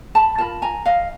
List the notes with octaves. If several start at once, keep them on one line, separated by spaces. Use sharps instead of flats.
A5 B5
F4 A#4 A5 B5
G#5 A#5
D#5 F5